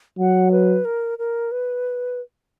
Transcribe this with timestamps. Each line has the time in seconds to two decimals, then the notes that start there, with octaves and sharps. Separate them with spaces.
0.19 F#3 F#5
0.52 B4
0.85 A#4
1.19 A#4
1.52 B4